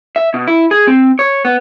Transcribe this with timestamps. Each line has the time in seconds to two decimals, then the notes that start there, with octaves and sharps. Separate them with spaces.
0.16 E5
0.34 B2
0.48 E4
0.71 G#4
0.87 C4
1.19 C#5
1.45 B3